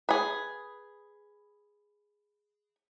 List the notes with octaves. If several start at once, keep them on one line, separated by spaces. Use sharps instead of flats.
G#4 B4